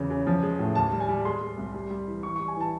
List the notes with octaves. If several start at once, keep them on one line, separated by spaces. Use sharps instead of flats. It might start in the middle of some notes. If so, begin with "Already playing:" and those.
Already playing: E2 C#3
C#3
F3
G#3
A2
D#2 A5
G3
G#5
G3
G#3 C6
G#3
C2
G3
G3
E3
E3 C#6
C#6
G3
G#5
E3 A5